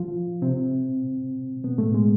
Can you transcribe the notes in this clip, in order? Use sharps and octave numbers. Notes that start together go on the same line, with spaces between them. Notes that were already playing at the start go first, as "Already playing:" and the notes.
Already playing: F3 F4
C3 C4
B2 B3
A2 A3
G#3